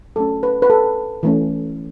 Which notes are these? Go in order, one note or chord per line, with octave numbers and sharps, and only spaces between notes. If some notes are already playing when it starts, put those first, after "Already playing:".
F#3 A3 C#4 A4
B4
B4
A4
E3 A3 C#4